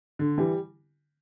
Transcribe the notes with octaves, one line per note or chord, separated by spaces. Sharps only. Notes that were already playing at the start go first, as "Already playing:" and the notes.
D3
E3 G3